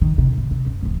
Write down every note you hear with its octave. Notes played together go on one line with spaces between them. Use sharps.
D#3
C3 D#3
A2
C3
F#2
D1 F3